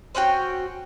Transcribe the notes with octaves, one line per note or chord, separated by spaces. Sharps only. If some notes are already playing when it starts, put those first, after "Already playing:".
C4 C#4 F#4 G5